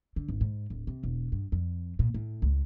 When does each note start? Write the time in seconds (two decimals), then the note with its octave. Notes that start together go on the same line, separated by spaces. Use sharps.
0.16 D3
0.28 G#1
0.41 G#2
0.70 D1
0.87 C3
1.03 E1
1.32 G2
1.52 F2
1.99 A#2
2.14 A2
2.42 C#2